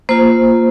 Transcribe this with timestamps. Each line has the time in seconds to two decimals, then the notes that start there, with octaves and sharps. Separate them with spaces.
0.09 A#3 F4 C5